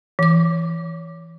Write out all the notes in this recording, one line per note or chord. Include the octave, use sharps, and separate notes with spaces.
E3 D6